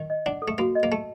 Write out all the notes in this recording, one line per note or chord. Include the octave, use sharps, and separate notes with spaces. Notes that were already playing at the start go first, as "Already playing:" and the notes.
Already playing: D#3
D#5
D4 F#5
A4
A3
A#3 F#4
D#5
A#3
A3 A5